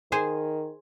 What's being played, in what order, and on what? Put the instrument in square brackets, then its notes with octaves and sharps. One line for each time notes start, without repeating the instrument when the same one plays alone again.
[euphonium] D#3 [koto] G#4 C5 G#5